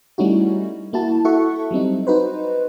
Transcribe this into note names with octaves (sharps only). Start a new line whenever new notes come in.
G3 A3 C#4 D#4 E4 F#4
A#3 E4 F#4 A5
E4 F#4 A4 E5 F#5 C#6
F#3 G3 C4 D#4
D#4 F#4 B4 C5